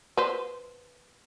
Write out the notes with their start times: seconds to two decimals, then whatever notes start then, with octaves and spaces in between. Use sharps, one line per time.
0.17 B4 C5